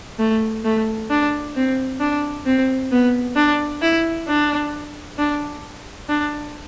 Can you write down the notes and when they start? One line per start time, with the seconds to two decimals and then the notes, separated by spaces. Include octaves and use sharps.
0.19 A3
0.65 A3
1.10 D4
1.56 C4
2.00 D4
2.46 C4
2.92 B3
3.36 D4
3.82 E4
4.28 D4
5.18 D4
6.09 D4